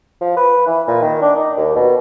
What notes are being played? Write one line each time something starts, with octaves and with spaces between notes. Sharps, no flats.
F3
B4
E3
A#2
D#3
D4
D#4
D#2
B2